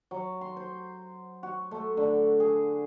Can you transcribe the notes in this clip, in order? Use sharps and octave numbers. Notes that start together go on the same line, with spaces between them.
F#3
C6
C5
F#4
A3
D3
G#4